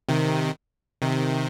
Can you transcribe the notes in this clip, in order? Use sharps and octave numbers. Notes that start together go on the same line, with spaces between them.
C3 D#3
C3 D#3